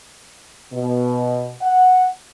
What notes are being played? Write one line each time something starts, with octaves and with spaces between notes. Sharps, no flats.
B2
F#5